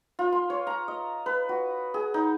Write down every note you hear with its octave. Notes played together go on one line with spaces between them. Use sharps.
F4
C6
C#5
A#5
D#5
B4
F#4
G#4
D#4